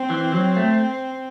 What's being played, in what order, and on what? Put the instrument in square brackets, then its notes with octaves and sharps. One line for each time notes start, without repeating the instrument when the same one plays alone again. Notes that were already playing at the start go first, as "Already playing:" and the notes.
Already playing: [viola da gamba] C4
[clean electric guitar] E3
F#3
A3